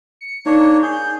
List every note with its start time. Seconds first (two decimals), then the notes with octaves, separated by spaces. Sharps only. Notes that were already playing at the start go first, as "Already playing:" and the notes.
0.21 C#7
0.46 A#3 D4 D#4 C#5
0.82 G#4 G6